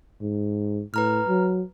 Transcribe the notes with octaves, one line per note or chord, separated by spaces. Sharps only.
G#2
A2 B4 A#5 F6
F#3